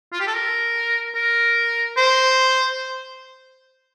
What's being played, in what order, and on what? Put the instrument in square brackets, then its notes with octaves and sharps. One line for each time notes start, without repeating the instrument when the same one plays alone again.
[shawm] F4
G4
A4
A#4
A#4
C5